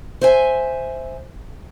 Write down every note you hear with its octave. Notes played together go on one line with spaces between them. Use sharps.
C5 E5 G#5